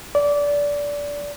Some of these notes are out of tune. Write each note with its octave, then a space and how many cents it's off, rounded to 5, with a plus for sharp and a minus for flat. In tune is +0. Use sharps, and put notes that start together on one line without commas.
D5 -20